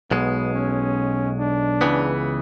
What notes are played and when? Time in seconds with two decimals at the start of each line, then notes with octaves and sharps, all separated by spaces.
0.11 B1 B2 G#3 B3
0.54 C#4
1.39 D4
1.81 C#2 C#3 E3 B3